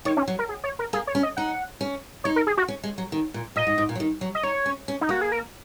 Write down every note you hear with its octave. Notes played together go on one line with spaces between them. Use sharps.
D#3 C#5
C#4
F#3
A#4
G#4
C#5
A#4
A#3 G#4
C#5
C#4
D#5
D#4 F#5
C#4
D#4 C#5
A#4
G#4
F#4
C#4
G#3
F#3
D#3
A#2
A#2 D#5
G#2
G#2
A#2
F#3
D#3
F#3
D#5
D#4 C#5
C#4
C#4
D#4
A#3 F#4
G#4
A#4